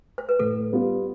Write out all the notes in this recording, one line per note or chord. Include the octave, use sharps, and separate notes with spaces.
C5
B4
A2 A4
G3 B3 F4